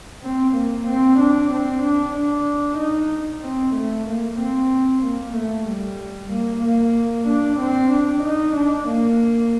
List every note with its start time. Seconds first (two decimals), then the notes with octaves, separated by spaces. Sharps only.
0.23 C4
0.55 A#3
0.88 C4
1.20 D4
1.52 C4
1.83 D4
2.16 D4
2.79 D#4
3.43 C4
3.75 A3
4.08 A#3
4.40 C4
5.04 A#3
5.36 A3
5.69 G3
6.32 A#3
6.63 A#3
7.28 D4
7.60 C4
7.92 D4
8.24 D#4
8.57 D4
8.88 A#3